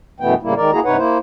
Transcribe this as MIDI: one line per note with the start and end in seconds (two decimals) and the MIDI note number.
0.20 0.34 42
0.20 0.34 47
0.20 0.34 52
0.20 0.34 57
0.20 0.34 59
0.20 0.34 79
0.43 0.54 45
0.43 0.54 49
0.43 0.54 55
0.43 0.54 58
0.43 0.54 64
0.56 0.71 51
0.56 0.71 56
0.56 0.71 70
0.56 0.71 74
0.72 0.80 58
0.72 0.80 64
0.72 0.80 66
0.72 0.80 68
0.72 0.80 82
0.85 0.97 43
0.85 0.97 48
0.85 0.97 63
0.85 0.97 71
0.85 0.97 73
0.85 0.97 78
0.97 1.18 58
0.97 1.18 64
0.97 1.18 72